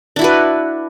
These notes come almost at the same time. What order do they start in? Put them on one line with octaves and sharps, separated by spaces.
D4 E4 F#4 B4